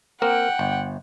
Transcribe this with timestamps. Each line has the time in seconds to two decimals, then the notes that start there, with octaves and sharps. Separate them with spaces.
0.22 A#3 C4 A#4 F#5 G5
0.59 G1